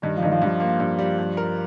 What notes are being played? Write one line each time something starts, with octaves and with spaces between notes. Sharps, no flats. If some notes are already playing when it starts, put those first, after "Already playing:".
G2 D#3
F3
G2 D#3
F3
G2 F3
A#3
G2
G3
G2
A#4